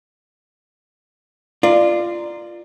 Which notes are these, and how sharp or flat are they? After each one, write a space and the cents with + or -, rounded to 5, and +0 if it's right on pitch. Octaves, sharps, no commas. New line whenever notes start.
F4 -15 A#4 +0 D5 +20